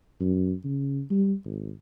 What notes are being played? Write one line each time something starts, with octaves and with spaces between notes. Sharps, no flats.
F#2
C#3
G3
G#1